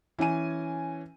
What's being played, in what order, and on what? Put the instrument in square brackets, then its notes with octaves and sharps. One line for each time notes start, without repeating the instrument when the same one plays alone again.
[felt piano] E3 C#4 G#5 D#7